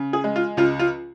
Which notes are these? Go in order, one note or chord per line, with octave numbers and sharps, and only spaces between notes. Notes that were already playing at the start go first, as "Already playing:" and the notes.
Already playing: C#3
G#4
G#3
F4
C#2 F4
F4